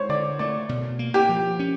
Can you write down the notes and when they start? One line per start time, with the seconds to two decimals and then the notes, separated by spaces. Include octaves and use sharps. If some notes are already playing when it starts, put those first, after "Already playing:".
Already playing: G#3 C5 C#5
0.09 D3 D5
0.39 A3 D5
0.69 B2
0.99 A#3
1.14 G4
1.29 F3
1.59 C#4